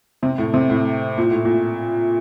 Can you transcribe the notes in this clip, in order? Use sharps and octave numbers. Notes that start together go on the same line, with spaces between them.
C3
A2
C3
A2
A#2
A2
A#2